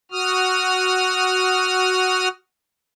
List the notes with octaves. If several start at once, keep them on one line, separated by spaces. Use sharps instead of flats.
F#4 D#6 F6